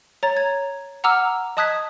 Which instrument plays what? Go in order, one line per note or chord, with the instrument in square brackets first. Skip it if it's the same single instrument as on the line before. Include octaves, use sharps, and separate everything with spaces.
[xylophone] C#5 A#5 A6
G#6
F#5 A#5 D6 E6 F6
D#5 A5 D#6 F#6 G#6 B6